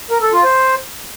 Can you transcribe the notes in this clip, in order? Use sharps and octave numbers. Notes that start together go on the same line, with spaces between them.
A#4
A4
F4
C5